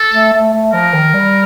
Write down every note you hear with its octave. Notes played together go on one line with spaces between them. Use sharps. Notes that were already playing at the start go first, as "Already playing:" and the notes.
Already playing: A4
A3
A3
A3
F3 A#4
D#3
G3